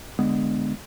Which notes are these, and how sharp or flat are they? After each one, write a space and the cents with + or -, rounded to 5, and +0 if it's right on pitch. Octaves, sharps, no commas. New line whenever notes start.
D3 +0 G#3 +0 B3 +0